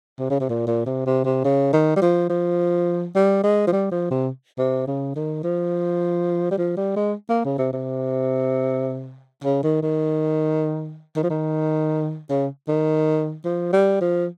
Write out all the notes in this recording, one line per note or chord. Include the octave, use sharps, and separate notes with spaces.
C3
C#3
C3
A#2
A#2
C3
C3
C3
C#3
D#3
G3
F3
F3
G3
G#3
F3
G3
F3
C3
C3
C#3
D#3
F3
G3
F3
G3
G#3
A#3
C#3
C3
C3
C#3
D#3
D#3
D#3
F3
D#3
C#3
D#3
F3
G3
F3